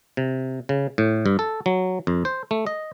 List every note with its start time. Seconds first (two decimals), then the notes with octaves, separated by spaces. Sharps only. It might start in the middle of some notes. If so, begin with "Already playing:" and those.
0.17 C3
0.69 C#3
0.98 A2
1.26 G2
1.39 A4
1.66 F#3
2.07 F2
2.25 C5
2.51 A3
2.67 D#5